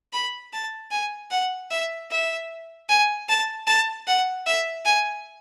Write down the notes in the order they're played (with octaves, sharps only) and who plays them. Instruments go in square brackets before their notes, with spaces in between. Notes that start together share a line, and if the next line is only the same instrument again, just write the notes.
[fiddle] B5
A5
G#5
F#5
E5
E5
G#5
A5
A5
F#5
E5
G#5